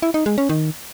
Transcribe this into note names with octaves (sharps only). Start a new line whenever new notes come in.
E4
D#4
G#3
C#4
D#3